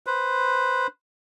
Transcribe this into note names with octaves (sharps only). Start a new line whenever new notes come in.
B4 C5